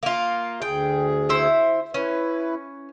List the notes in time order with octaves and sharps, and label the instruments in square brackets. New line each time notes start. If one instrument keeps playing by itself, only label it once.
[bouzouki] A#3 F4
[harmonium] D2 G#4 [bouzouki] G5
[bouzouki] E4 C5
[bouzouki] C#4 [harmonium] E4 B4